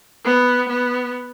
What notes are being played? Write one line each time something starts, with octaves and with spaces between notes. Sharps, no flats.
B3
B3